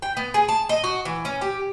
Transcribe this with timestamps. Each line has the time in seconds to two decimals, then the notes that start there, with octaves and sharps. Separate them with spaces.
0.02 G5
0.17 B3
0.34 G#4
0.48 A5
0.69 D#5
0.84 F#4
1.05 E3
1.25 C#4
1.41 G4